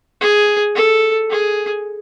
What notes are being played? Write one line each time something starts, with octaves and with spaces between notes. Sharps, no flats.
G#4
A4
G#4